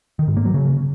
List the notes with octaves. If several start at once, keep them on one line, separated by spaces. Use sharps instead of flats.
D#3
G#2
A#3
F#3
C#3